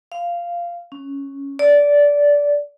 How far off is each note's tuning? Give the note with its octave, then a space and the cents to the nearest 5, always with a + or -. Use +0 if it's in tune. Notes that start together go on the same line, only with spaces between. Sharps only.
F5 -10
C#4 +0
D5 -15